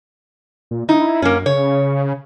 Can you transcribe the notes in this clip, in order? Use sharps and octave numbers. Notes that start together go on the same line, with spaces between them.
A#2
D#4 E4
F#2 A#3 C#4
C#3 C#5